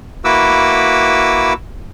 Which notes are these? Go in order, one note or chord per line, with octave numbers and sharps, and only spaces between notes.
A#3 E4 F#4 B4 D6 E6